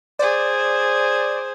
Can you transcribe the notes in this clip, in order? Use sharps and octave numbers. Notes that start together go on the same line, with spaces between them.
G#4 C5 D5